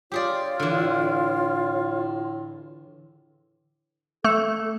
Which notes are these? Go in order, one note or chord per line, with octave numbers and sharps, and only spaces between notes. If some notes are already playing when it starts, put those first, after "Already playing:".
F4 G4 G#4 C#5 D5
A2 D3 E3
A3 A4